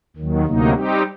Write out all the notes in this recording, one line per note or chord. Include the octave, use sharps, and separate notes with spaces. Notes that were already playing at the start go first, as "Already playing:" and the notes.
D#2 D#3 F#3
D2 C3 F#3 A#3 D#4
G3 C4 D#4 G4